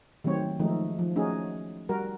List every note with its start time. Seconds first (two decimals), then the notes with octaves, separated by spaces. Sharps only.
0.24 D#3 F#3 A3 C4 C#5
0.59 D#3 F3 G#3 A3 D#4
0.99 F3
1.16 A3 C#4 D#4 F#4 G#4
1.89 G3 F#4 A#4